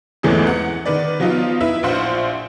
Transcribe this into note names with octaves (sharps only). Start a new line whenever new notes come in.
G#1 E2 E3 A3 C#4 G#4
F#5
D#3 B4 D5
F3 F#3 B3 D#4 F4
E4 B4 E5
A#1 F4 C5 F#5